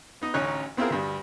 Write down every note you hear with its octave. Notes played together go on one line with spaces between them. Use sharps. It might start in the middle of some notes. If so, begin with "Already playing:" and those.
B3 D#4 D#5
A1 D2 C#4 D#4 C#5 F#6
B3 C4 E4 F4 G#4 A#4
D2 G2 G3